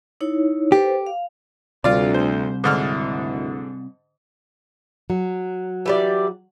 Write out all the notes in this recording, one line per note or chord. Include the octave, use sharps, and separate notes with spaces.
D#4 E4 C#5
G4 A4 B4 C5
F5
D2 C3 G3 F4 D5
C5
G#1 D2 G#2 D3 E4 F6
F#3
E3 G3 D5